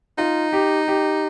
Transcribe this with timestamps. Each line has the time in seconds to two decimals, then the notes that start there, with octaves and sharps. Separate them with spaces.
0.18 D#4 F4
0.53 G4
0.88 G4